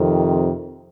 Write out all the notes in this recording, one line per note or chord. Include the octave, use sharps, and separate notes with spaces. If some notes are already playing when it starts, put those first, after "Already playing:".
Already playing: F2 C3 D#3